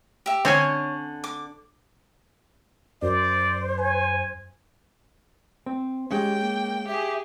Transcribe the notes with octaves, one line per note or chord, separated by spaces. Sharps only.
G4 E5
D3 C4 C#4 C#5 G#5
D6
F#2 C5 D5
G#5
C4
G#3 C#4 G4 G5
A#3
G4 G#4 E5